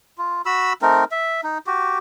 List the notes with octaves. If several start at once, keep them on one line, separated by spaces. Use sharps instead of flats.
F4
F#4 B5 E6
A3 C4 D#4 A#4
E5
D#4
F#4 G4